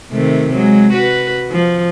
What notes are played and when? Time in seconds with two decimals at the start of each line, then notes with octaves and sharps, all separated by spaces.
0.12 C3 D#3 A3
0.54 F#3 G#3
0.93 F#4 B4
1.51 F3